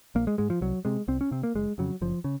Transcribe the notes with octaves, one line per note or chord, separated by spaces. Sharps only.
A#1 A#3
G#3
G#2 G#3
F3
C2 F#3
C3 G#3
C2 C4
C#4
C3 C4
A#3
F#1 G#3
F2 C#3 F#3
F#1 F3
C#3